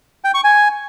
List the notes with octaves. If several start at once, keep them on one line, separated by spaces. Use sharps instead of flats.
G5
C#6
G#5